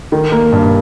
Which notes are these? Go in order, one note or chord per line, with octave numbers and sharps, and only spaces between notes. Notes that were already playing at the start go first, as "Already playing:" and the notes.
D#3
A#3
G2